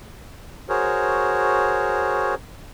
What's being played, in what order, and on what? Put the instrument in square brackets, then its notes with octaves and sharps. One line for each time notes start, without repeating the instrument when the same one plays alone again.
[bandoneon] F#4 G#4 A#4 C5 C#5